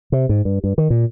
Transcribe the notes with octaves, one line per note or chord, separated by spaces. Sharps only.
C3
G#2
G2
G2
D#3
A#2